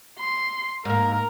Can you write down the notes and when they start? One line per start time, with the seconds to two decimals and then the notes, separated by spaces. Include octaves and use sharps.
0.19 C6
0.85 G#2 A#3 A#4